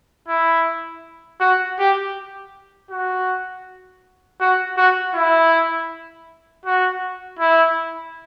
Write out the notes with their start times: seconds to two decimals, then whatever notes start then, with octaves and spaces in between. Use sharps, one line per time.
0.28 E4
1.40 F#4
1.79 G4
2.90 F#4
4.40 F#4
4.77 F#4
5.15 E4
6.66 F#4
7.39 E4